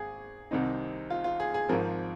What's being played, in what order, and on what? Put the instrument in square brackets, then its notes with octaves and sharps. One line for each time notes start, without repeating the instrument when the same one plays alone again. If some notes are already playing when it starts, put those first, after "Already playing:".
Already playing: [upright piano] G#1 G#4
C2 C3 D#3 C4 D#4
F4
F4
G#4
G#4
G#1 G#2 F3 C4 A#4